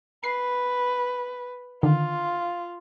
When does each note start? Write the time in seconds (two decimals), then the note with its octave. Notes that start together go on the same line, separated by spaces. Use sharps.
0.24 B4 C7
1.83 D3 D#3 F4